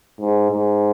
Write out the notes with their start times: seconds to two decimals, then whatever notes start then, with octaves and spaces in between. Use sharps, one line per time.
0.21 G#2
0.51 G#2